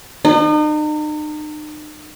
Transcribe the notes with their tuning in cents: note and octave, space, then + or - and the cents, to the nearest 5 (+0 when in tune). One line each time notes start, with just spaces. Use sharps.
D#4 -40